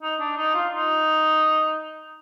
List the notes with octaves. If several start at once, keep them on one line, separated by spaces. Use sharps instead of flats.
D#4
D4
D#4
F4
D#4